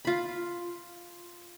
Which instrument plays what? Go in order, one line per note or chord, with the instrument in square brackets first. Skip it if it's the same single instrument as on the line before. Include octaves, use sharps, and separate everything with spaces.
[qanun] F4 B5